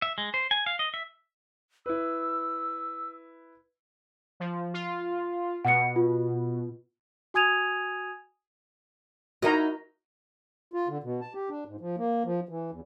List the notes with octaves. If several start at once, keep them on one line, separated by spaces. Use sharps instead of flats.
E5
G#3
C5
G#5
F5
D#5
E5
E4 B4 E6
F3
F4
B2 F#5 C#7
F4
F#4 G#5 D#6 G#6 D#7 F7
D#4 E4 F#4 A#4 D#5 A#5
F4
D3
B2
A5
G4
D4
G#2
F3
A#3
F3
E3
E2